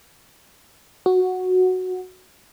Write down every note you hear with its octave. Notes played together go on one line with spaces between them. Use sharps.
F#4